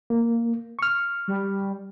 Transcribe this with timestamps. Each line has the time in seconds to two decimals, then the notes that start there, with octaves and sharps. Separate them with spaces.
0.10 A#3
0.79 C#6 F6
1.28 G3